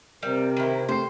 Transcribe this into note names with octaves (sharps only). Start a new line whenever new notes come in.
C3 G3 A#4
D#3 E4
A3 C5 G5 C7